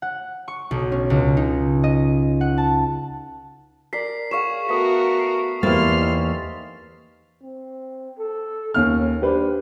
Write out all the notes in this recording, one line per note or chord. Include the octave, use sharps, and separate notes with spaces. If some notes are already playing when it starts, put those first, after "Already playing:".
F#5
C#6
B1
C#4
C#2
D#4
D#5
F#5
A5
A#4 D5 B6 C7
G#4 C#5 F5 F#5 C#6 E7
A3 B3 F#4 A#4 D#6 B6
C7
E2 A#3 C4 E4 G4 C6 F6 A6
D#4
C4
A4
D#2 C#4 F6
D4 G4 B4 C5